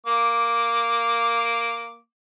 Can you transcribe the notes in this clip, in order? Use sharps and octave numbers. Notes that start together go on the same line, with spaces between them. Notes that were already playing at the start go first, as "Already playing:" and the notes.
A#3 D6